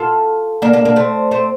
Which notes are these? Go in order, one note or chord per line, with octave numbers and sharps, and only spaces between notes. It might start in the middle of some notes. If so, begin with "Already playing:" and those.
Already playing: F4 A4
A#3 D4
A#3 D4
A#3 D4
A3 C4
A3 C4